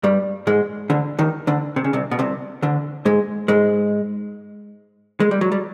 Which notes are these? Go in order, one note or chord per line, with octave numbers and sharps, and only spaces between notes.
G2 G3
G#2 G#3
D2 D3
D#2 D#3
D2 D3
C3
C#3
C2 C3
B2
C2 C3
D2 D3
G#2 G#3
G#2 G#3
G#3
G3
F#3
G3